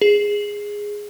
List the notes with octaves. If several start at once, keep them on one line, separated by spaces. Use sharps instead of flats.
G#4